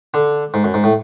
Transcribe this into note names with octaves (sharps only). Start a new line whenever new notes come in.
D3
G#2
F#2
G#2
A2